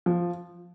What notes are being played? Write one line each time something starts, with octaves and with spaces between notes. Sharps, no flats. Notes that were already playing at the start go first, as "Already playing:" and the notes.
F3